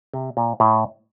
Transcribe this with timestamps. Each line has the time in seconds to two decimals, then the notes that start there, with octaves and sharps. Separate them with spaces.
0.14 C3
0.37 A#2
0.60 A2